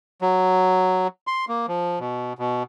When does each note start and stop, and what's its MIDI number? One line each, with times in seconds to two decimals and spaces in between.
0.22 1.07 54
1.27 1.45 84
1.49 1.66 58
1.68 1.99 53
1.99 2.33 47
2.39 2.63 47